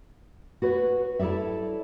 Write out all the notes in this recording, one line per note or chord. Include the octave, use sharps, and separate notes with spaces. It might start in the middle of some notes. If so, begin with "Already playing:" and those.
F#4 B4 C#5
E4 A4 C#5 D5 E5